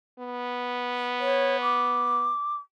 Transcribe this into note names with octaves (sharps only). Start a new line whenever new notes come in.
B3
C#5
D6